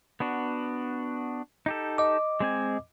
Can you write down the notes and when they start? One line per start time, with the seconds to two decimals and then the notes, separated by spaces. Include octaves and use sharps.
0.20 B3 D4 F#4
1.66 D#4 G4 A4
1.98 D#5 D6
2.40 G#3 C4 G#5